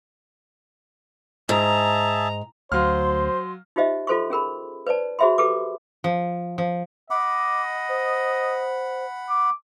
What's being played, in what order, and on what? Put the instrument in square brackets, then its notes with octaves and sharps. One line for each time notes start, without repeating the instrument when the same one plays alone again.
[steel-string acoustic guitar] G#2 [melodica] G#4 E5 A5 [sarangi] A#5
[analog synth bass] D2 [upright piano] F#3 F5 F6 [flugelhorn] C5 [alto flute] C6
[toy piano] D#4 F4 G4 C5 D#5 E5
F4 A4 C5 C6 C#6
C#4 G#4 A#4 B5
B4 C5 D5 A5
F#4 G#4 C5 E5 B5 C6
G4 A4 B4 C#6 D6
[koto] F3
F3
[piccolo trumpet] D#5 [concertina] F#5 B5 [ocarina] D6
[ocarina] C5
[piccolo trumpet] D6